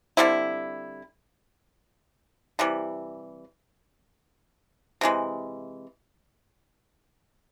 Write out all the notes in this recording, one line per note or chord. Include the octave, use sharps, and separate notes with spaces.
D3 G3 C4 E4
C3 E3 G3
C3 E3 G#3